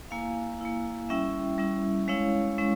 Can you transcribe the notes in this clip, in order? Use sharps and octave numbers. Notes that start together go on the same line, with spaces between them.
A#3 E4 F5 G#5
A#3 E4
G3 C#4 E4 E5 G5
G3 C#4 E4
G#3 C#4 E4 C#5 F5
G#3 C#4 E4